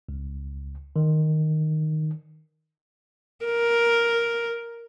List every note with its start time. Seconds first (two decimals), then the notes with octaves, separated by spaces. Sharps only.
0.09 C#2
0.96 D#3
3.45 A#4